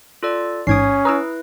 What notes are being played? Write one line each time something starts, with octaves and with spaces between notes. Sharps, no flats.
F4 A4 D5
A1 G#2 C#4 D#6 G#6 C7 D7
E4 B4 A#5 D#6 E6